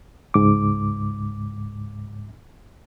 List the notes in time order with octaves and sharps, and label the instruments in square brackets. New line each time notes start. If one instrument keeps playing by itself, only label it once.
[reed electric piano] C#2 G#2 D6